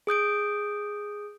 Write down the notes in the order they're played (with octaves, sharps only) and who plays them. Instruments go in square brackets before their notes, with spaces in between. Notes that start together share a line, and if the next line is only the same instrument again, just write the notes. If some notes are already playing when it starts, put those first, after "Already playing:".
[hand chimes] G#4 D#6 G6 D7